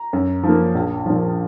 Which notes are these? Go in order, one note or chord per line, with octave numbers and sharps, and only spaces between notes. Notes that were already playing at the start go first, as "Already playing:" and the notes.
Already playing: A#5
F#2
F3
A#3
A#1
A#2 F3